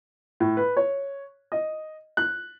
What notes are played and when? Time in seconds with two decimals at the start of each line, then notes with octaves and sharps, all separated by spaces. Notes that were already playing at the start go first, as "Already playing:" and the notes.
0.40 A2
0.57 B4
0.77 C#5
1.52 D#5
2.17 F#6